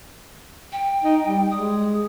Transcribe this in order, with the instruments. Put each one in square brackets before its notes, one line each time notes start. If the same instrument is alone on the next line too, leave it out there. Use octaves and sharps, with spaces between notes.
[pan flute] G5
[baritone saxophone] D#4
G3
[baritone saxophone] G#3 [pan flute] D#6